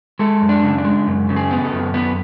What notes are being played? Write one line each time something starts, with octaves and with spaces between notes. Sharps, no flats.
G#3 A4
F#2
D4
C#3
D4
G#3
F#2
C#3
G#4
B3
A4
F#2
B3